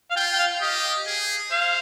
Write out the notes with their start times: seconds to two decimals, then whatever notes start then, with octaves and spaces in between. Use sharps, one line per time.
0.11 F5
0.16 F4 G5
0.34 G5
0.39 F5
0.61 G4 D#5
1.06 G#4
1.51 C5 F5